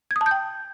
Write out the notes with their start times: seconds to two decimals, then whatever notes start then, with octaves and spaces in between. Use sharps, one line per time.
0.11 G#6
0.16 D#6
0.21 A5
0.26 G6
0.31 G5